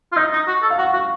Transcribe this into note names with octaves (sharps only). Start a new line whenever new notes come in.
F4
D#4 D#5
D#4
F#4
A4
F5
F#4 F#5
F#4 F5